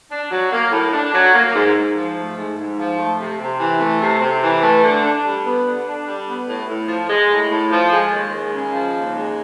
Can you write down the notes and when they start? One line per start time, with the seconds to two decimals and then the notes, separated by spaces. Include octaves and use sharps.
0.11 D4
0.31 F#3
0.52 A#3
0.72 A2
0.93 D4
1.14 F#3
1.34 A#3
1.55 G#2
1.75 G#2
1.95 F3
2.17 A3
2.37 G#2
2.57 G#2
2.78 F3
2.98 A3
3.19 C3
3.40 C3
3.60 E3
3.80 A3
4.01 C3
4.21 C3
4.42 E3
4.63 A3
4.83 D3
5.03 D4
5.24 G3
5.45 B3
5.66 D3
5.86 D4
6.06 G3
6.27 B3
6.48 A2
6.68 A2
6.88 F3
7.09 G#3
7.30 A2
7.50 A2
7.71 F3
7.92 G#3
8.12 D#2
8.33 G#3
8.53 C#3
8.73 F3
8.94 D#2
9.15 G#3